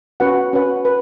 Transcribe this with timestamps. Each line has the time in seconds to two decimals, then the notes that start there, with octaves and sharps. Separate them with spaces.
0.20 C#4 F#4 B4 F#5
0.53 C#4 F#4 B4 F#5
0.85 B4